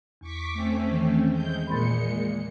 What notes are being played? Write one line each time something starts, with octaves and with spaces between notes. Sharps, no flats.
E2 C#6 D6 B6
A3 C4 C#4
D#3 E3
G#3 G6
A#2 G#3 B5 C6 A6 C#7